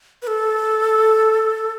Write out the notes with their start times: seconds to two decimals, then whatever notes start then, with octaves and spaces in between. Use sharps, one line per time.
0.22 B4
0.27 A4